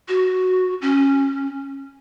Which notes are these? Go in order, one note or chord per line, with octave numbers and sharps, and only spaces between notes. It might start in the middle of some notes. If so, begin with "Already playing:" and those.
F#4
C#4